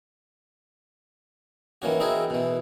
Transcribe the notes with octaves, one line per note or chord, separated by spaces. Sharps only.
D#3 E3 A#3 C#4 F#4
C4 D#4 E4 F#4 G#4 A#4
B2 E3